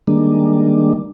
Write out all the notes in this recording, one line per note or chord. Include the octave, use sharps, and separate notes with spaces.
D#3 G3 G#3 A#3 D4